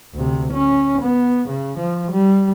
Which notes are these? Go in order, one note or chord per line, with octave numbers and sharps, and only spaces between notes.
D2 C3
C#4
B3
C#3
F3
G3